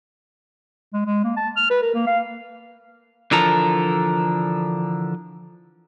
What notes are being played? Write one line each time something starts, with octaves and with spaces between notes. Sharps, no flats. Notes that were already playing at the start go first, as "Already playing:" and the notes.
G#3
G#3
A#3
A5
F6
B4
A#4
A#3
F5
D3 E3 F3 A4 A#4